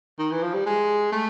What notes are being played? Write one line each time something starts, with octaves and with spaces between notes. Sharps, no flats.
D#3
E3
F3
G3
G#3
A3